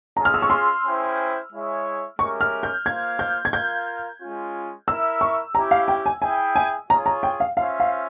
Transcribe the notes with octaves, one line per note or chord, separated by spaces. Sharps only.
C#4 F4 G#4 A#5
F6
E6
C#6
C6
C#4 E4 G#4 C5 G5
G#3 E4 G#4 C#5 E5
G#3 C#4 G4 A#4 E5 C#6
F6
G6
A#3 F4 C5 F5 G#6
G6
G#6
F4 A#4 F5 G6
G#3 C#4 F4
E4 A#4 E5 E6
C#6
C#4 E4 G4 A#5
F5
G5
G#5
E4 G#4 E5 G5 G#5
G#5
F4 G#4 C#5 A#5
A#5
G5
F5
C#4 F4 C5 E5 F5
F5